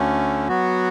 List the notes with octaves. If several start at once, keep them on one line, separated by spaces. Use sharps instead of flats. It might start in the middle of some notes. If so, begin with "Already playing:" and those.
Already playing: D2 D3 A3 C#4
F#3 B3 F#4